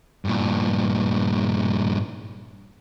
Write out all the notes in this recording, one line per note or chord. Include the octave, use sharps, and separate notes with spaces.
G2 A#2